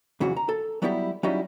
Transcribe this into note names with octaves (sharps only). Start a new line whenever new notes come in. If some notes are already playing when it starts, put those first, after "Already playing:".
F2 C#3 E3 F#3 F#4
A#5
A4
F#3 G3 B3 E4 F#4 G4
F#3 G3 C#4 D#4 E4 D#5